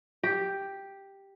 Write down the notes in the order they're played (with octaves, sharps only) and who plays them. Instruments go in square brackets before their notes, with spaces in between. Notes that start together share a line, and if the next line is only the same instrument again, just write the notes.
[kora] G4